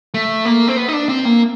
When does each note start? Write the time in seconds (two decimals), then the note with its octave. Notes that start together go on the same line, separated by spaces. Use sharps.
0.14 A3
0.45 A#3
0.68 C4
0.77 B3
0.89 D#4
0.93 D4
1.09 C4
1.25 A#3